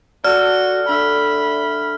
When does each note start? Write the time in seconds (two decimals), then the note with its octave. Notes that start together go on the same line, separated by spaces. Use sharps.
0.24 F#4 A4 D5 F6
0.89 D3 E5 B5